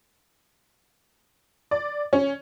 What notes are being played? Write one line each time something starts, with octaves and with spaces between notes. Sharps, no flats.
D5
C#4